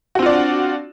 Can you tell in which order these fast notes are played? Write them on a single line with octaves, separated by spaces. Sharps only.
F#4 C4 F4 D5 D4